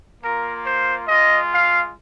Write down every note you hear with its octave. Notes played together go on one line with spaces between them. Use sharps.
A#3 F4 A#4
C5
G#3 F4 D#5
F5